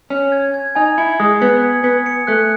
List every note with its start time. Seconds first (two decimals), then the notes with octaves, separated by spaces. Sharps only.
0.10 C#4 G#5
0.32 G#6
0.54 G#6
0.75 D#4 G#5
0.98 E4 C#7
1.20 G#3 D#6
1.40 B3 C#7
1.63 G#6
1.84 B3 C#7
2.06 C#7
2.27 A3 F#6